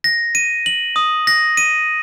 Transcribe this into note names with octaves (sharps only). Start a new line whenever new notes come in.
A#6
D#7
F#7
D#6
A#6
D#7